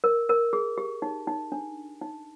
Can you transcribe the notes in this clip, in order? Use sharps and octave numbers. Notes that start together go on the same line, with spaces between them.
A#4
A#4
G#4
G4
D#4
D#4
D4
D#4